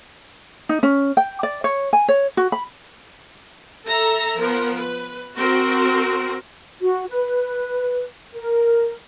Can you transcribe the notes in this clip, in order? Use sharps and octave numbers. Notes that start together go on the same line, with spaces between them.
D#4
C#4
G5
D5
C#5
G#5
C#5
F#4
B5
A4 E5 A#5
F3 B3 A#4
B4
C4 F#4 A#4
F#4
B4
A#4